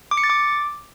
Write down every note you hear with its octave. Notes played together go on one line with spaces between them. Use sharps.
D6
C#7
A6
D6